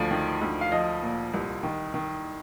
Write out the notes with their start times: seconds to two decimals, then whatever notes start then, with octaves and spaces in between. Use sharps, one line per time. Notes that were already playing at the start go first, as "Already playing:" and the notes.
Already playing: D2 F3
0.11 D#3
0.41 D2
0.61 F5
0.72 F3 D#5
1.02 A#2
1.34 C2
1.63 D#3
1.94 D#3